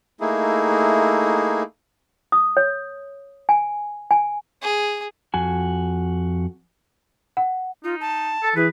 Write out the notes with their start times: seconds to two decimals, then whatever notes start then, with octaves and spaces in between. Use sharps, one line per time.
0.20 A3 A#3 D#4 E4 G#4
2.32 D#6
2.57 C#5
3.49 G#5
4.11 G#5
4.62 G#4
5.34 F2 F#4 G#5
7.37 F#5
7.84 D#4 F4
8.01 A5
8.43 A4
8.56 E3 G#4 B4